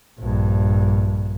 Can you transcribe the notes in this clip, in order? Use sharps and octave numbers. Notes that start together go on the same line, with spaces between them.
A#1 G2